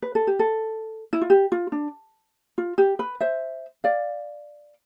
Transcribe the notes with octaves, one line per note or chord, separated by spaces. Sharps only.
B4
A4
G4
A4
E4
F4
G4
F4
D4
F4
G4
B4
C5 E5
D5 F5